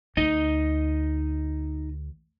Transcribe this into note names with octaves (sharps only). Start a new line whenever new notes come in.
D2 D#4 D#5